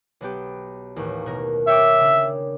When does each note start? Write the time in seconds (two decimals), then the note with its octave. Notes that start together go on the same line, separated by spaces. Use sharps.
0.21 B1 B3 G4
0.96 A1 D#2
1.26 B2 A#4
1.67 C#5 E5 G5 D6
2.00 C#3 D4